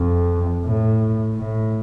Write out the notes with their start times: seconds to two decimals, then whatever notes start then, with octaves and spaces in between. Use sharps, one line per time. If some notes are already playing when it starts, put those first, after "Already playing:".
Already playing: F2
0.63 A2
1.35 A2